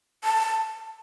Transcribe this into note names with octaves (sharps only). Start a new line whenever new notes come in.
A5